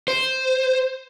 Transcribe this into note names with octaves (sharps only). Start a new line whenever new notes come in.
C5